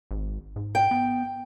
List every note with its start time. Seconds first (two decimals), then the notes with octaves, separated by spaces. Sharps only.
0.11 G#1
0.56 G#2
0.75 G5
0.91 B3